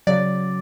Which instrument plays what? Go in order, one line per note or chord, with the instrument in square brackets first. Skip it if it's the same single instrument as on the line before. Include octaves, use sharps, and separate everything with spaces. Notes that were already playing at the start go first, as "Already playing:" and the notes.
[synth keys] C#3 F#3 D5